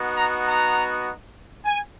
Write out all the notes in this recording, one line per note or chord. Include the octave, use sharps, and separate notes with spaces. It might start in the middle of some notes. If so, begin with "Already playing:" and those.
Already playing: B3 D#4 F#4
A#5
A#5
G#5